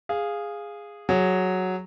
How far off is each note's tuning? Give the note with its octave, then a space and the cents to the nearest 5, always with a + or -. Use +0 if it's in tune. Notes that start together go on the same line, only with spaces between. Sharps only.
G#4 -10 F5 +0
F#3 +0 G#4 +0